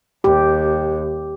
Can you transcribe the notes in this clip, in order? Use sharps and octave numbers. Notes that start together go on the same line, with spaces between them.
D#2 G4